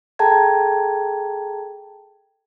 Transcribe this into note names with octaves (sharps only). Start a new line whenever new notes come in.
G#4 A4 G5 A5 A#5 G#6